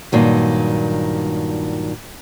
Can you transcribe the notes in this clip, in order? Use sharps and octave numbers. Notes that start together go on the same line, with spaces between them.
G2 A#2 D#3 F#3